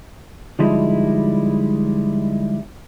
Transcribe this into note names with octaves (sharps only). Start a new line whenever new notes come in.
D3 F3 G3 G#3 D#4 E4